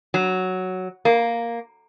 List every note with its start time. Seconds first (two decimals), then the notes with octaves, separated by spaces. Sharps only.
0.14 F#3
1.05 A#3